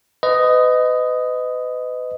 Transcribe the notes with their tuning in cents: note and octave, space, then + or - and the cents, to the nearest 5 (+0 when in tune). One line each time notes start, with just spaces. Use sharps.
B4 +35 D#5 +0